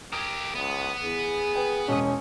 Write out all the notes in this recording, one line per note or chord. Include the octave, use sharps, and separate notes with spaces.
G4 A#4 D#6 G#6 D7
C#2 B3
E2 G#4
B4 G5
E1 G#3 C#4 D#6